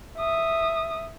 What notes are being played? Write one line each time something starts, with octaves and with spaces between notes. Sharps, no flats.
E5 D#6